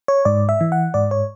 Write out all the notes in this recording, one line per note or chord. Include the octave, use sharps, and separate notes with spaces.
C#5
G#2 D5
E5
E3
F#5
G#2 D5
C#5